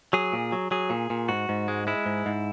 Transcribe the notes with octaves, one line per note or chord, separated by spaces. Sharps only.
F#3 G#4
A#2
F#3
F#3 G#4
A#2
A#2
G#2 F#4
G#2
G#3
G#3 E4
G#2
G#2